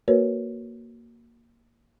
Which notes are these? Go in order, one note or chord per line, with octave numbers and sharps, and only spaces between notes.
A#3 F#4 A#4 B4 C#5